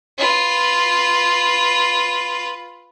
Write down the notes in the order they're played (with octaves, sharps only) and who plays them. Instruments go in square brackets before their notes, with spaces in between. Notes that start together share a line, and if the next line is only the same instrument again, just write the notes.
[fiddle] F4 B4